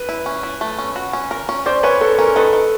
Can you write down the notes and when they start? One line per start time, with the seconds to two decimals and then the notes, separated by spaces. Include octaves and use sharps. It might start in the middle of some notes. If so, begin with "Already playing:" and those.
Already playing: B4
0.09 E4
0.26 C#4
0.43 E4
0.61 A3
0.79 C#4
0.96 F#4
1.13 C#4
1.31 A#4
1.49 C#4
1.66 C#4 C5 D5
1.83 C#4 B4 C#5
2.01 C#4 A4 B4
2.18 C#4 A#4
2.36 D#3 A4 B4
2.53 D#3